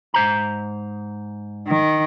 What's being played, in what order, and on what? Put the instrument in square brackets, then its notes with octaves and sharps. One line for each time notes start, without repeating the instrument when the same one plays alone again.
[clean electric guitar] G#2 C5 A#5
[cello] D#3